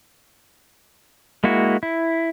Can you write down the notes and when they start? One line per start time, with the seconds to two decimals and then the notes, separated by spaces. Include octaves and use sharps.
1.44 G#3 A#3 E4 F#4
1.83 E4